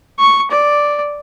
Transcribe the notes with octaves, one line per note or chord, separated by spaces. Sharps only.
C#6
D5